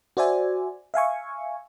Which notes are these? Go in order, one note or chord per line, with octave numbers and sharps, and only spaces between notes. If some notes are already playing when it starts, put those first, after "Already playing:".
F#4 C5 D5 E5 G#5
E5 F5 G#5 C#6